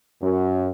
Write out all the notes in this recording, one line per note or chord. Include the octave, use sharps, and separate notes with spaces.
F#2